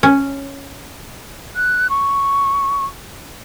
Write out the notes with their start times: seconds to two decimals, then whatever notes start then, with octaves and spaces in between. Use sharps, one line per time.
0.03 C#4
1.56 F#6
1.90 C#6